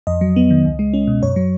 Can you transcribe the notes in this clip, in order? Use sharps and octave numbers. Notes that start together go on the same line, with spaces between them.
F2 D#5
F#3
B3
D#3
C#2
G#3
C#4
B2
F#2 C#5
F#3